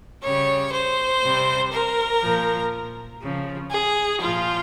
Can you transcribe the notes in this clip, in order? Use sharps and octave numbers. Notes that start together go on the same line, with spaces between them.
C#3 G3 C#5
C5
C3 G3
A#4
A#2 F3
C#3 F3
G#4
A#2 F3 F4